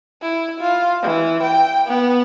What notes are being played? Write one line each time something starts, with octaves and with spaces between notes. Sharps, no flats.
E4
F4
E3
G5
B3